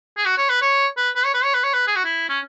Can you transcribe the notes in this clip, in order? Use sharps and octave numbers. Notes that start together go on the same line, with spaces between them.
G#4
F#4
C#5
B4
C#5
B4
B4
C#5
B4
C#5
B4
C#5
B4
G#4
F#4
E4
C#4